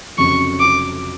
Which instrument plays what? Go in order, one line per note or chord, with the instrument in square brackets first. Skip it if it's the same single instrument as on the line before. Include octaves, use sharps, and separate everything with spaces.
[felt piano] F1 F2 C#3 F#3 [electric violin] C#6
[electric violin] D6